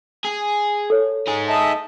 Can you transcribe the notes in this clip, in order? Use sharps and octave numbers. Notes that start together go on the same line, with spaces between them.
G#4
A4 C#5
D#4 G#4
D#5 E5 A5